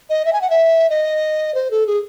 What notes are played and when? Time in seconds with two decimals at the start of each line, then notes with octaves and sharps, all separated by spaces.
0.10 D#5
0.25 E5
0.33 G#5
0.41 F#5
0.50 E5
0.90 D#5
1.55 C5
1.71 A4
1.87 G#4